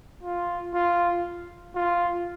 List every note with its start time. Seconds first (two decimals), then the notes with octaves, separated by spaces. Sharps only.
0.23 F4
0.74 F4
1.76 F4